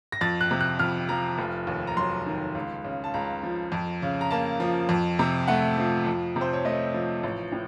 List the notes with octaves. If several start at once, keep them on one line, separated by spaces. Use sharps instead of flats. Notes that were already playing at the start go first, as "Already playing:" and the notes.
A#6
F2 A6
F#6
C3
F#6
F2 F6
F3 A#5
F1
D#2
A#5
F#3 C6
D#3
C#2
C#3
A5
C#2 A#5
F3
F2
C#3
A#5
A#3 A5
F3
F2
C3
A3 F#5
F3
F2
C3
C5
C#5
A3 D#5
F3
A1
A2